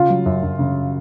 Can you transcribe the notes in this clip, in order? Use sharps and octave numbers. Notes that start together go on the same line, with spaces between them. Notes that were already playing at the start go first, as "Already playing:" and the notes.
Already playing: C#3 F4
F#3
F#2
F#2
C#3